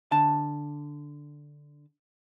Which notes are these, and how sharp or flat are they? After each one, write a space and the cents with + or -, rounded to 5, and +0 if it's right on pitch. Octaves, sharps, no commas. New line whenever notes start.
D3 +0 A5 +0